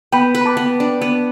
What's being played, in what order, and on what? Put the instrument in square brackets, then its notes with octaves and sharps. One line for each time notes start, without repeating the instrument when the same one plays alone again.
[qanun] B3 [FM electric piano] G5 B5
[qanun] B4
[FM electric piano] B5
A5 D6
[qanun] B3
D4
B3